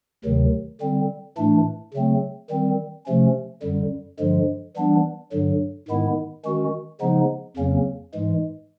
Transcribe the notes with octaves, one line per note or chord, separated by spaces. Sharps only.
D2 C3 D#3 F#3
D3 G3 C4
A2 E3 A3 D4
C#3 F#3 A3 C4
D#3 G3 C4
C3 F3 A3 C#4
F#2 D3 G3
G2 D3 F3 G#3
E3 G3 B3 D4
G2 D3 F#3
G#2 D#3 G#3 B3 E4
D#3 G#3 C#4 F#4
C#3 F3 G#3 B3 D#4
F2 C#3 F#3 A#3 C#4
G#2 E3 G#3